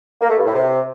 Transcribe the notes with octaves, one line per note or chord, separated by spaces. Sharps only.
A#3
A3
G2
A2
C3